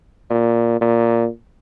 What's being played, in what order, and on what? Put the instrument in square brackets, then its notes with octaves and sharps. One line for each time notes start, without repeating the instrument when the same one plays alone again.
[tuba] A#2
A#2